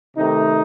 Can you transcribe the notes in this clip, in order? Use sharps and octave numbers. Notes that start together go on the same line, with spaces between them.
C3 D#3 A3 D#4